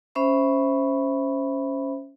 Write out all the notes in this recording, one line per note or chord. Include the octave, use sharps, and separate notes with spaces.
C#4 C5 E5 B5